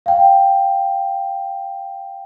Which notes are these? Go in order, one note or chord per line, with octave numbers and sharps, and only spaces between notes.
F5 G5